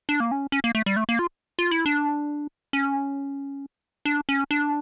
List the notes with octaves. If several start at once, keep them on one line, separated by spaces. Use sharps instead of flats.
D4
A#3
C#4
C#4
A#3
A3
G3
A3
A#3
F4
F4
E4
D4
C#4
D4
C#4
D4